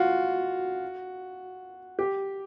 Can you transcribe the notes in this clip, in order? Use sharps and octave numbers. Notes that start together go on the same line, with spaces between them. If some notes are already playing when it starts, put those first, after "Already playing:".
Already playing: F4 F#4
G4